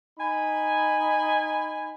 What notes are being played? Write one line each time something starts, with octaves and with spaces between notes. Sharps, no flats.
D#4 G#5 B5